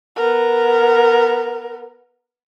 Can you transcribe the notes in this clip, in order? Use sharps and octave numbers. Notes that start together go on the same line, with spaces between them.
B3 A#4